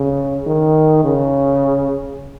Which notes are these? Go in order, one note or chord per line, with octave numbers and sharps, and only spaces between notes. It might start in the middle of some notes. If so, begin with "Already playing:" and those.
Already playing: C#3
D#3
C#3